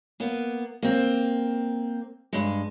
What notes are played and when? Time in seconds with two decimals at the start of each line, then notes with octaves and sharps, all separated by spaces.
0.20 A#3 B3
0.82 A#3 C4
2.33 G2 G#3